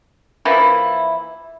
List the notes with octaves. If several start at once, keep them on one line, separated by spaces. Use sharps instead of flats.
E3 F3 A#3 E4